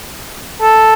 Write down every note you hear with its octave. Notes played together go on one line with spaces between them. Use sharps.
A4